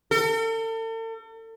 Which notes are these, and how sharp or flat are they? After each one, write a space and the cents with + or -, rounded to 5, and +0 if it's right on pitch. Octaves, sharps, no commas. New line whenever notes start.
A4 +40